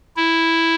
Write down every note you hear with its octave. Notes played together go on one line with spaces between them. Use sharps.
E4